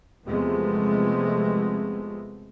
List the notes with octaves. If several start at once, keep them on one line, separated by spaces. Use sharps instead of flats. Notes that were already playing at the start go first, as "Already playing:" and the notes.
E2 C3 F3 G#3 A3 B3